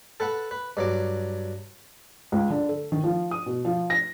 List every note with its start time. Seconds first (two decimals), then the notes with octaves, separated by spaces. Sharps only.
0.20 A4 B4 F#5
0.51 B4
0.77 G2 F#3 D6
2.32 C#2
2.50 D3
2.69 A4
2.92 D#3
3.04 F3
3.31 D#6
3.46 B2
3.65 F3
3.90 A#6